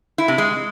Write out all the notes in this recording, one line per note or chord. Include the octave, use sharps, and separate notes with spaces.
E4
C3
G#3